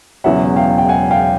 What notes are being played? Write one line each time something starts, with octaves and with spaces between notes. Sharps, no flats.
E1 E2 C#3 F#3 E5 F#5
F5 G5
G5
F#5 G#5
F5 G5